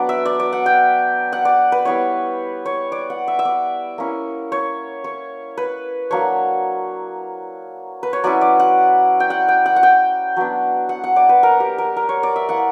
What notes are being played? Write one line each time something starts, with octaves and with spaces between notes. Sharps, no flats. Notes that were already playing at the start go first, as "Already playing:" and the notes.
Already playing: F#3 B3 D4 D5
E5
D5
D5
F#5
G5
F#5
D5
B4
G3 B3 E4 C#5
C#5
D5
F#5
E5
E5
D5
A#3 C#4 E4
C#5
C#5
B4
F#3 A#3 D4 C#5
B4
C#5
F#3 C#4 E4 D5
D5
F#5
G5
F#5
G5
F#5
F#5
G5
F#3 B3 D4
F#5
F#5
D5
B4
A#4
G4
A#4
A#4
C#5
D5
E5
A#3 E4 F#5